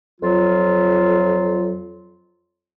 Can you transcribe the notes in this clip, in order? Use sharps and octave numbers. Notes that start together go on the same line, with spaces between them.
F2 F#3 F4